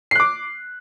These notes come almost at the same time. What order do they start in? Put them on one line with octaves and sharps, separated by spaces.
C7 F#6 D6